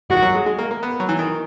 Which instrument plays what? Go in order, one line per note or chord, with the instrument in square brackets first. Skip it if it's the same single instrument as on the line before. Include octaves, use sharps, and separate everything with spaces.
[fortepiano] D#3 [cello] F#4
[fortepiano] F#3
G#3
G#3
A#3
A#3
B3
F#3
E3
D#3